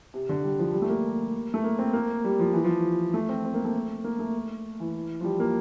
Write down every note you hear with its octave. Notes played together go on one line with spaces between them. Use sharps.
C3
D3
G3
F3
G3
A3
A#3
A3
A#3
C4
A#3
G3
F3
E3
F3
A3
C4
C4
A#3
A3
A#3
A3
E3
F3
G3
A#3